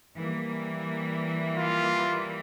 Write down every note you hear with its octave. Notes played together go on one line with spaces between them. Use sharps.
E3 G3 A#3
F4